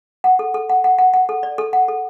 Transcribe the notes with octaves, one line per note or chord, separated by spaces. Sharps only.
F#5
A4
A4
F#5
F#5
F#5
F#5
A4
D5
A4
F#5
A4